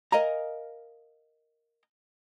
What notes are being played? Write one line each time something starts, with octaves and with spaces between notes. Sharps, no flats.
A#4 D#5 F5 G#5 A#5